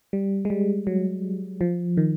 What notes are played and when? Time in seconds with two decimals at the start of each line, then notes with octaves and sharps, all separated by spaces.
0.13 G3
0.45 G#3
0.50 G3
0.87 F#3
1.61 F3
1.97 D#3